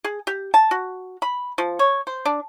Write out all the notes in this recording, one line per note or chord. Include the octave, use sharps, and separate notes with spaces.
G#4
G4
A5
F#4
B5
F3
C#5
C5
D4